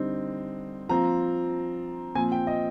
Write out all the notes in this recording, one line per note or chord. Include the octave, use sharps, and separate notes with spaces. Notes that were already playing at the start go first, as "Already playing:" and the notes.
Already playing: D3 G3 C4 D#4
F3 C4 F4 A#5
A#2 F3 C4 G#5
G5
D#5